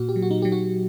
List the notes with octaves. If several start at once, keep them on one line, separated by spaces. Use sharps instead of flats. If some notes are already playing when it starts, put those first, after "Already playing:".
Already playing: A#2 F#4
G4
F#3
F#4
D#4
F#3 G4
F#4